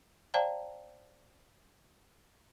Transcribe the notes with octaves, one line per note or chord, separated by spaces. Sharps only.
C5 D5 F5 G5 A5 A#5